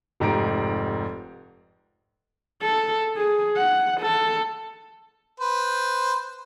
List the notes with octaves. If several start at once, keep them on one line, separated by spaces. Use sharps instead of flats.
F1 G#2 G4 A#5 D7
A4
G#4
F#5
A4
B4 C5